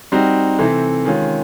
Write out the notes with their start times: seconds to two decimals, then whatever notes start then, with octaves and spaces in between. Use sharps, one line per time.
0.12 G3 C4 D#4 F#4
0.58 C3 E3 A3 C4
1.05 D#3 G#3 C#4 F4